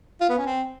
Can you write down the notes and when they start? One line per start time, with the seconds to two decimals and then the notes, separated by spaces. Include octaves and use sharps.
0.21 F4
0.29 B3
0.38 C#4
0.46 C4